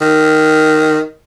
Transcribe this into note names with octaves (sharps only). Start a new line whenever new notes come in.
D#3